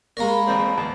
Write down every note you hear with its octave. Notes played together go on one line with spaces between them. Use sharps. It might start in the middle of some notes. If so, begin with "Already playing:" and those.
G#3 A#3 A#4 C#5 A#5
B5
A1 F3 C4
E2